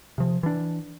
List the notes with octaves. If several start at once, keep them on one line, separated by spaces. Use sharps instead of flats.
C3 F3
E3 D4